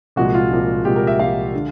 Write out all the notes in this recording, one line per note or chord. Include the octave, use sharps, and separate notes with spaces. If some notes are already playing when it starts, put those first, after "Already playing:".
C2 A#2 F3 G#3 F#4
F4
C2 A#2 F3 G#3
C2 A#2 F3 G#3 G4
A#4
E5
C2 A#2 F3 G#3 F5
D3